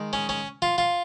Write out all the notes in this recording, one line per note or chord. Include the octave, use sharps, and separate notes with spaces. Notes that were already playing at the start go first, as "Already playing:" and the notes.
Already playing: D#3 G#3
C#4
C#4
F4
F4